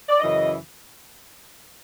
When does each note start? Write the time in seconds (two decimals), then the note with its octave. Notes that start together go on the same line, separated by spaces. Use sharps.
0.09 D5
0.20 F#2 C#3 E3 D#5